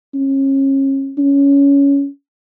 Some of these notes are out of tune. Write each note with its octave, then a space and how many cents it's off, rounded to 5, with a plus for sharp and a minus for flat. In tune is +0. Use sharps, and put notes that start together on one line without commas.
C#4 -35
C#4 +15